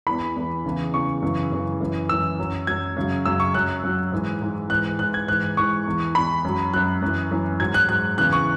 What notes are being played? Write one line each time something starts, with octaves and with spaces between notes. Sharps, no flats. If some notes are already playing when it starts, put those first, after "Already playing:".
E2 E3 B5
E2 E3
E2 C#3 E3
E2 C#3 E3 C#6
F#2 C#3 E3
F#2 C#3 E3
F#2 E3
F#2 E3 E6
F#2 F#3
F#2 F#3 G#6
F#2 C#3 F#3
F#2 C#3 F#3 E6
C#6
F#2 F#3 F#6
F#2 F#3
G#2 E3
G#2 E3
G#2 E3 F#6
F#6
G#2 E3 F#6
G#6
G#2 E3 F#6
G#2 E3 C#6
E2 E3
E2 E3 B5
F#2 F#3
F#2 F#3 F#6
F#2 E3
F#2 E3
G#2 F#3 G#6
F#6
G#2 F#3 F#6
E2 C#3 E3 F#6
C#6